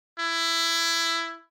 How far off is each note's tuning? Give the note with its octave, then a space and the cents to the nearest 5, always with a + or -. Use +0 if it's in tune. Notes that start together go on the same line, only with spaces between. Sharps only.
E4 +15